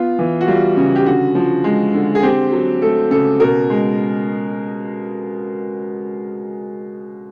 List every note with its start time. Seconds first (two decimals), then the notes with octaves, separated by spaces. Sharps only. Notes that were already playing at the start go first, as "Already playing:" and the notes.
Already playing: B3 F4
0.19 E3
0.41 F#4
0.47 G3 F4
0.77 C#3
0.95 G4
1.06 D3 F#4
1.35 F3
1.64 G#3
1.94 D3
2.15 G#4
2.23 C4 G4
2.52 F#3
2.82 A3 A4
3.11 C#3 A4
3.40 B2 A#4
3.70 G#3